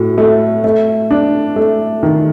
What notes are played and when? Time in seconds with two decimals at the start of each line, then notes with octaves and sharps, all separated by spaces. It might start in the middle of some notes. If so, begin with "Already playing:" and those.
Already playing: A2 F#4
0.18 A3
0.64 A3
1.11 D4
1.56 A3
2.03 D#3